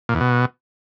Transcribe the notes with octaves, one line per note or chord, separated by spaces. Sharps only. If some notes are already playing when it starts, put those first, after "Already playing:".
A#2
E2
B2